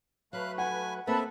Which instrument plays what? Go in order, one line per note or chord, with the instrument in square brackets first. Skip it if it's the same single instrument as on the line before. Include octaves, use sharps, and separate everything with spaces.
[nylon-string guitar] F#3 [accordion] A3 B4 [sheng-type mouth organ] F5 F#6
[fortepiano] F#5 [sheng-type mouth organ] G#5
[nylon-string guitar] A#3 C4 D#5 [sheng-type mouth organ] A4 E5 [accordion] B4 A5 B5